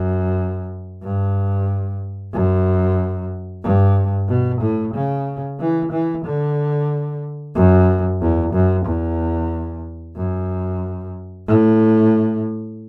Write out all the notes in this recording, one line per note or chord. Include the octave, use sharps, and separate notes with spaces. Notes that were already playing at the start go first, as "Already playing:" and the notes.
Already playing: F#2
G2
F#2
G2
B2
A2
C#3
E3
E3
D3
F#2
E2
F#2
E2
F#2
A2